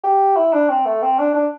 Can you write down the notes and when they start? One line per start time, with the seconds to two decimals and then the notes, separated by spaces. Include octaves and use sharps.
0.04 G4
0.36 E4
0.53 D4
0.69 C4
0.86 A3
1.03 C4
1.19 D4
1.34 D4